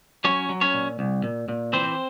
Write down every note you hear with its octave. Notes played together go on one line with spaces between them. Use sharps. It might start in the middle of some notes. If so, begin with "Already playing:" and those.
F#3 C#4 C#5
F#3
C#4 C#5
A#2
C2
A#2
A#2
E3 C4 C5